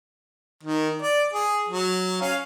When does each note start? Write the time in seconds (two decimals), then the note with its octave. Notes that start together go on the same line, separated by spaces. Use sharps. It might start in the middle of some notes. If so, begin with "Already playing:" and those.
0.63 D#3
1.02 D5
1.34 G#4
1.69 F#3
2.21 C#4 F5